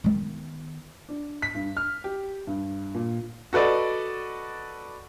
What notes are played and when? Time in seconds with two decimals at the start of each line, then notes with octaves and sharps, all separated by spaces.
0.04 D#3 B3
1.09 D4
1.42 B6
1.55 G2
1.77 F6
2.04 G4
2.47 G2
2.94 A#2
3.53 F#4 A4 B4 D5 D#5